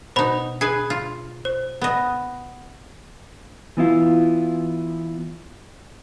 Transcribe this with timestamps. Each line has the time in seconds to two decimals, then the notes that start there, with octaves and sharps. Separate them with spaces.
0.16 B2 D#4 C5 B5
0.61 G#4 B4 G#5 C7
0.90 F4
1.45 C5
1.82 B3 D#5
3.77 E3 B3 E4 F4